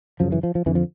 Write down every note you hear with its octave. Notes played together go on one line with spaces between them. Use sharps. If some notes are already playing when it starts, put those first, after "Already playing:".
F#2 C#3 F3
E3
F3
F3
F2 D3 E3
F3